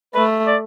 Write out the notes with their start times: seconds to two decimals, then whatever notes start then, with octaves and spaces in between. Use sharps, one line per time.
0.15 A3 B4
0.47 D5